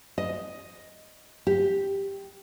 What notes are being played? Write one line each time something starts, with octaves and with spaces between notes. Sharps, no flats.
D#5
G4